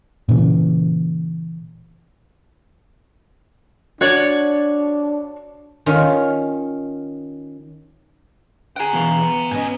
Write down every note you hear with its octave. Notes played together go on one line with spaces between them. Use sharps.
A#2 C#3 E3
D4 F#4 C#5 D5
D#3 C#4 F4
G#4 F#5 G5 A#5
B2 E3 F5
B3
G#2 C#4 D#5 G#5